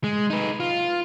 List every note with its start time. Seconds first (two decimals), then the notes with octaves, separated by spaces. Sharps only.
0.04 G#3
0.30 D#4 B4
0.60 F4